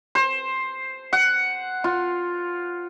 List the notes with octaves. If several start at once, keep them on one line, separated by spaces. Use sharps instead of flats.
C5
F#5
F4